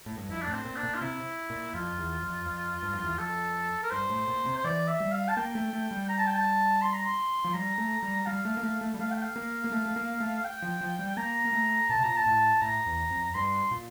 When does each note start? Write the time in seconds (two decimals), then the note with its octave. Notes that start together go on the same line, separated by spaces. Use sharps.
0.06 A2
0.18 G2
0.29 F2 E4
0.42 A2 D4
0.52 C4
0.65 A#2
0.76 D4
0.83 A#2
0.95 F4
1.01 C3 E4
1.50 A#2
1.74 F2 F4
1.98 E2
2.23 F2
2.46 F2
2.83 G2
2.93 F2
3.04 E2
3.15 F2 A4
3.83 A#4
3.91 G2 C5
4.10 A2
4.28 A#2
4.46 C3
4.57 C5
4.64 E3 D5
4.88 E5
5.00 G3
5.12 F5
5.29 A5
5.36 A#3 G5
5.55 A3
5.73 A3
5.91 G3
6.09 A#5
6.18 A5
6.27 G5
6.35 A5
6.82 C6
6.94 A#5
7.05 C6
7.44 F3
7.54 G3 A#5
7.78 A3
8.03 G3
8.26 G3 F5
8.45 A3
8.57 A#3
8.63 A3
8.81 A3
8.94 G3
8.99 A3 F5
9.12 G5
9.23 F5
9.36 A#3
9.64 A#3
9.72 A3
9.86 A3
9.96 A#3
10.20 A3
10.44 G5
10.62 F3
10.81 F3
10.99 G3
11.17 A#3 A#5
11.45 A#3
11.53 A3
11.89 A#2 A5
11.97 C3
12.04 A#2 A#5
12.17 A5
12.26 A2
12.62 A2 A#5
12.86 E2
13.11 F2
13.35 G2 C6
13.71 A#2